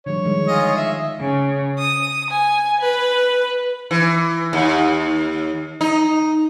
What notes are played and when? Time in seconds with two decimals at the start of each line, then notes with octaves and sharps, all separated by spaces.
0.06 D3 F3 G3 C#5
0.25 D#3 G#3
0.48 F4 G#4 D#5
0.77 E5
1.20 C#3
1.79 D#6
2.30 G#5
2.81 B4
3.91 E3
4.53 D#2
5.81 D#4